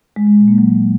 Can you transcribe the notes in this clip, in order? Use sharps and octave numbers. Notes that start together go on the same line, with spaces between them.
G#3
G#3
A#2
A#3
F#3